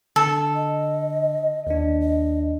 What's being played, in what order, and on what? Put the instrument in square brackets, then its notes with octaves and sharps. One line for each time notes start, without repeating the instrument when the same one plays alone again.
[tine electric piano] D3 [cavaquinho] A4
[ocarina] D#5
[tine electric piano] D#2 D4 [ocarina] D#5
[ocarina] D#5